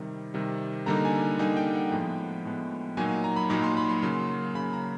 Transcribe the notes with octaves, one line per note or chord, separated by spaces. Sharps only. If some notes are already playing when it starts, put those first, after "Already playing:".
Already playing: C3 D#3 G3
C3 D#3 G3
D3 G3 A#3 D#4 A#5
G#5
D3 G3 A#3 D#4 G#5
G5
F#5
A2 F3 G#3 B3 G5
A2 F3 G#3 B3
A#2 F#3 A#3 D#4 G#5
A#5
B5
A#2 F#3 A#3 D#4 B5
C6
B5
C6
C#3 F#3 A#3 C6
C6
C#3 F#3 A#3 B5
A#5